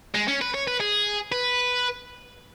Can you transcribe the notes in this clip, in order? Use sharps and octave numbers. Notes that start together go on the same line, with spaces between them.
G#3
C#4
B4
C#5
B4
G#4
B4